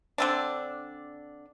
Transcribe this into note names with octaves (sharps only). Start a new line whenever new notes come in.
D3 C4 D4